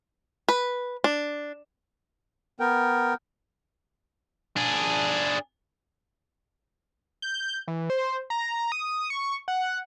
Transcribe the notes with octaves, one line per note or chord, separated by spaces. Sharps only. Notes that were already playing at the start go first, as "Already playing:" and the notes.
B4
D4
B3 A#4 G5
D4 G#4
G6
E3
C5
A#5
D#6
C#6
F#5